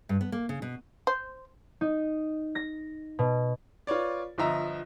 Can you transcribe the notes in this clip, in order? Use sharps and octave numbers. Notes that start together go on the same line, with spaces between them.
G2
B3
A#3
C#3
B2
C5
D#4
A#6
B2
F4 B4 C#5 D5
G1 F3 D#5 E5 A#5